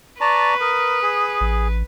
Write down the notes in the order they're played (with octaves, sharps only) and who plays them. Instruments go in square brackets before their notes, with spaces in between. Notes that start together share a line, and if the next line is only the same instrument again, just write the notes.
[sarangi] B4 [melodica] D5 A5 A#5 [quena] C#6
[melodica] A#4 [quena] D#6
[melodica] G#4
[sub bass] A1